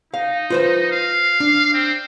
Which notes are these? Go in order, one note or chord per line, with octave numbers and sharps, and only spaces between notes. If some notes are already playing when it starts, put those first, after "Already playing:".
D#4 F5
F4 B4 C5
F5
D4
C4